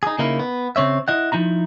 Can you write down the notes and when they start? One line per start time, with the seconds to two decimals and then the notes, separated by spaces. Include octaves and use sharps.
0.03 D#4 G#4
0.19 C#3 A#3 D#4 E4 A#4
0.39 B3
0.76 C#3 C4 C#5 E5
1.08 E4 D#5 F#5
1.32 F3 D#4 E4 A#5